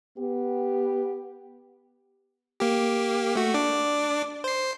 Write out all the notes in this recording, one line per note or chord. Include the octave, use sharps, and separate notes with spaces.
B3 G4
A#3 G4
A3 F#4
D4 D6
C5 C7